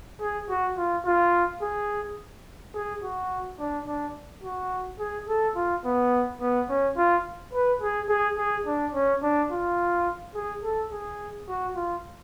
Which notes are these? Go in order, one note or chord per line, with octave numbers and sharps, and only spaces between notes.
G#4
F#4
F4
F4
G#4
G#4
F#4
D4
D4
F#4
G#4
A4
F4
B3
B3
C#4
F4
B4
G#4
G#4
G#4
D4
C#4
D4
F4
G#4
A4
G#4
F#4
F4